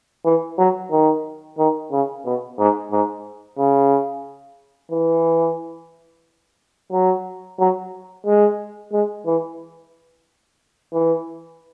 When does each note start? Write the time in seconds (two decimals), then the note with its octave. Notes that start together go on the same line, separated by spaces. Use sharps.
0.25 E3
0.58 F#3
0.92 D#3
1.58 D#3
1.92 C#3
2.25 B2
2.58 G#2
2.92 G#2
3.58 C#3
4.92 E3
6.92 F#3
7.59 F#3
8.26 G#3
8.93 G#3
9.26 E3
10.93 E3